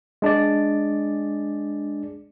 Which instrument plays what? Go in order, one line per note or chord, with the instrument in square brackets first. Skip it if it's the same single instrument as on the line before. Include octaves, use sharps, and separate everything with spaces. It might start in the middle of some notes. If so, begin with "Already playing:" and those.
[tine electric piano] G#3 D4 G#4 D5